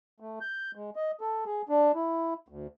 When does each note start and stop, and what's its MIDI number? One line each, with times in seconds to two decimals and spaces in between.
0.20 0.39 57
0.41 0.71 91
0.75 0.90 56
0.96 1.11 75
1.21 1.44 69
1.46 1.62 68
1.69 1.92 62
1.95 2.34 64
2.48 2.67 38